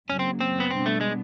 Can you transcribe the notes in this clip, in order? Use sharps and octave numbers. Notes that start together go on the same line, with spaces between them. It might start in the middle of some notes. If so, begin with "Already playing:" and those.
F#2 C#3 F#3 A#3 C#4
C4
C4
B3
B2 G3 B3 C4 D4
A3
G#3